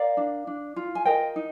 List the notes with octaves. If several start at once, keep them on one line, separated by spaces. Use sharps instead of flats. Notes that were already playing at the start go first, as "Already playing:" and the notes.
Already playing: A#4 D5 F5
D4
D4
F4
G#5
A#4 D#5 G5
D#4